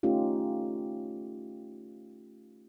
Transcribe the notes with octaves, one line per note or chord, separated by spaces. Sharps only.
A3 C#4 D#4 F4 G4